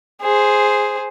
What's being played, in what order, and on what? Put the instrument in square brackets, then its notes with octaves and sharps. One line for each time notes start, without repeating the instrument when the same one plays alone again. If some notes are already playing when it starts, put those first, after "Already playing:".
[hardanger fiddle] G#4 C5